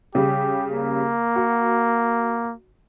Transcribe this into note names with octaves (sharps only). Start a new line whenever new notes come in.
C#3 G3 G4
A#3
F#4